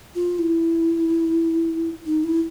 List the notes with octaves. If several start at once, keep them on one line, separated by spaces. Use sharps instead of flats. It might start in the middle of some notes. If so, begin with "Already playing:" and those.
F4
E4
D#4
E4